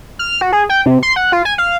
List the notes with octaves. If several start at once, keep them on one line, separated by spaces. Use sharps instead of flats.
F6
F#4
G#4
G5
C3
C6
F#5
F4
G#5
F5